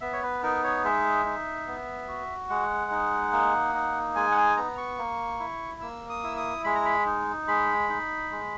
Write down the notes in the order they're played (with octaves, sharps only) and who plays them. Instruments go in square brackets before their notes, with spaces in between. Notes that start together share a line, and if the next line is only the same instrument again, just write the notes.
[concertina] B3 E5
C#5
B4
D#4 A#4
C#5
G#3 E5
D#4
B3
F#4
G#3 F#5
D#4
A#3
D#4
G#3 G#5
F#5
G#5
B3 A#5
C#6
A#3
E4
A#3 E6
D#6
E4 E6
D#6
G#3 B5
A#5
B5
D#4
G#3 B5
D#4
G#3